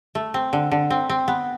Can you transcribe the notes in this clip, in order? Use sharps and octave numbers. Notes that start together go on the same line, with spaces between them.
A3
C4
D3
D3
C4
C4
B3